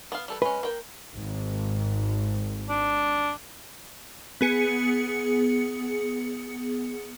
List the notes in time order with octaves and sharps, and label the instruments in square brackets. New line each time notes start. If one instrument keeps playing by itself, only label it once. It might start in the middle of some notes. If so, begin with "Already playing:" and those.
[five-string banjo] B3 F5
G3 A4 B4
[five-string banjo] G#3 C#4 [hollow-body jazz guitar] B4
[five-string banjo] A#3 G5
[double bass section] G#1
[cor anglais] D4
[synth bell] B3 G#4 C#7